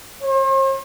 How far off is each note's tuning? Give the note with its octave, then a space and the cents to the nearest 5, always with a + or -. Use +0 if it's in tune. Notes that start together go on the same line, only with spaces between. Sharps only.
C5 +45